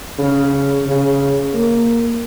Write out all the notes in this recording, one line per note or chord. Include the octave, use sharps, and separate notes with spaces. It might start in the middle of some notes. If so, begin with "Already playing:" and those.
C#3
C#3
A#3